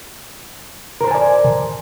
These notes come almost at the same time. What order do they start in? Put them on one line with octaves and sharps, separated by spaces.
A#4 C5 A5 G#5 D5